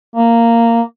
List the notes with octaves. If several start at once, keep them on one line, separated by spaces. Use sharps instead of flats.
A#3